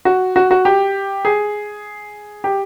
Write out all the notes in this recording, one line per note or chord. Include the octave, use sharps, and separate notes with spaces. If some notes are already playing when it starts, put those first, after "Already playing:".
F#4
F#4
F#4
G4
G#4
G4